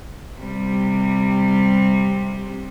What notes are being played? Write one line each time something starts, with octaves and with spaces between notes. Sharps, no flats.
C3 G3